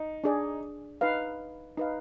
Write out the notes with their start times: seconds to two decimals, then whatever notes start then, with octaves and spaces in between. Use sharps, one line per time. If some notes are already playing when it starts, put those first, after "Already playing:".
Already playing: D#4
0.24 D4 G#4 D5
1.01 D#4 B4 F5
1.77 D#4 B4 F5